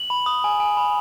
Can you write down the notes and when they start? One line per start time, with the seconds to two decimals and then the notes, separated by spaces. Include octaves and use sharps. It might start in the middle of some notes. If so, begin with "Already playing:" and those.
Already playing: F#7
0.10 B5
0.26 D#6
0.44 G#5
0.60 G#5
0.77 B5